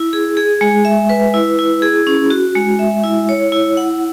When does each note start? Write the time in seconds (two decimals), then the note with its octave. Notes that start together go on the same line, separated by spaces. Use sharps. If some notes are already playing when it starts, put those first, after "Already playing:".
Already playing: E4
0.13 G#4
0.37 G#4
0.61 G#3
0.85 E5
1.09 B4
1.34 E4
1.59 E4
1.82 G#4
2.07 C#4
2.30 F#4
2.55 G#3
2.79 E5
3.04 E4
3.29 C#5
3.52 E4
3.77 F#5